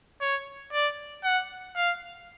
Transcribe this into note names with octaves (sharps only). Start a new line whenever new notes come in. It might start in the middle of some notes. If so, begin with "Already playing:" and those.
C#5
D5
F#5
F5